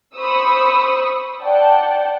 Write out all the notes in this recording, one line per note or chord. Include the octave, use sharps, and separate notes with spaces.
C5 B5 C#6 D#6 E6
D5 F#5 G5 A5